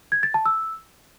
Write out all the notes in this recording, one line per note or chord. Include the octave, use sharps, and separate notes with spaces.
G#6
A6
A5
E6